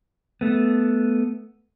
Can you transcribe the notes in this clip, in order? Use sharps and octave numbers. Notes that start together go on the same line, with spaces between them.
A3 B3